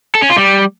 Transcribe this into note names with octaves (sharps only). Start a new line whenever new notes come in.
A4
C#4
F4
G3